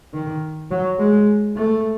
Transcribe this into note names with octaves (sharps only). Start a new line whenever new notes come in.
D#3
F#3
G#3
A3